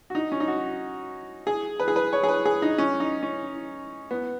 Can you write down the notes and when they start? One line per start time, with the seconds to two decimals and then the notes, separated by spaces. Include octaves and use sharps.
0.10 F#4
0.15 D#4
0.32 C#4
0.40 D#4
0.48 F#4
1.47 G#4
1.80 B4
1.88 G#4
1.96 B4
2.13 C#5
2.23 G#4
2.29 B4
2.45 G#4
2.62 D#4
2.78 C#4
3.00 D#4
3.23 C#4
4.11 B3